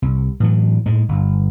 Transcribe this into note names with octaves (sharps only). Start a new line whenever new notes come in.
C2
A2 E3 F#3
A2 G#3
G1